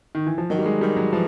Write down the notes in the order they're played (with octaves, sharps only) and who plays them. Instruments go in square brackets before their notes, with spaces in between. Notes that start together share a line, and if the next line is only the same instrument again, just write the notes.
[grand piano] D#3
E3
F3
[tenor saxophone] D#3 [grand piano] F#3
[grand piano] G3
G#3
[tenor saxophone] D#3 [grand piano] G3
[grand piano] F#3
[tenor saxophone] E3 [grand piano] F3